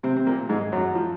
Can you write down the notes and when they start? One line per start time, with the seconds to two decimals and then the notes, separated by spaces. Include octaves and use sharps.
0.03 C3 C4
0.16 C4
0.26 A#2 A#3
0.49 G#2 G#3
0.72 F#2 F#3
0.95 F3